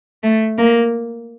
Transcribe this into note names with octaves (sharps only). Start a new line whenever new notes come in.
A3
A#3